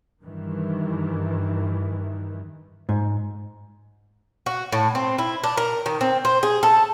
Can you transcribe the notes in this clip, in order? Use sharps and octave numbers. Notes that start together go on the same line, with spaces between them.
G2 D#3 E3
G#2
F#4
A2
C4
E4
D4
A#4
D#3
C4
C5
G#4
A4